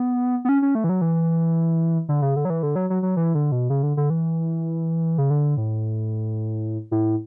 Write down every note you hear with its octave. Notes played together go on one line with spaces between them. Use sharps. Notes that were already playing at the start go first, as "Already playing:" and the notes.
Already playing: B3
B3
C#4
C#4
A3
E3
F#3
E3
D3
C#3
D3
F#3
E3
D3
F#3
F#3
F#3
E3
D3
B2
C#3
D3
D3
E3
C#3
D3
A2
A2